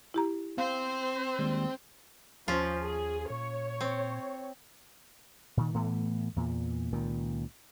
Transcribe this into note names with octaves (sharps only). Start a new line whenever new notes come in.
E4 G4 A#5
C4 C5 F5
D#2 G3 G#3
D#2 F3 C#4 F4
G#4
A#2 C#5
C4
A#2 D#3
A2 E3 A3 B3
E2 A#2
C#2 A#2 D#3